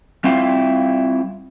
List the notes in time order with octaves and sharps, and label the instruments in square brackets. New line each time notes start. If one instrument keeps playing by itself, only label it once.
[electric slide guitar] G3 C4 E4 F4 F5